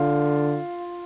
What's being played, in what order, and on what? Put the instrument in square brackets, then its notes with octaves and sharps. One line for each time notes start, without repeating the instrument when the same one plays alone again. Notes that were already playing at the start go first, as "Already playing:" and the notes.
Already playing: [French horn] D3 [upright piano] F4